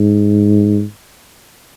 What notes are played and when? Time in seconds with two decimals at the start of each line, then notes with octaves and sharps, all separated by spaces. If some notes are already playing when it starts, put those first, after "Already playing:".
Already playing: G#2